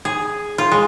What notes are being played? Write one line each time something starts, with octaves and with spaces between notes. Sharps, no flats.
G#4
F4
G#3